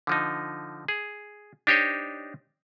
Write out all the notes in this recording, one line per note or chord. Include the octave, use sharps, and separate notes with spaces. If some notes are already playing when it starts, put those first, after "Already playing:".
D3 F3 D#4
G#4
D4 D#4 G4 C5 C#5 D#5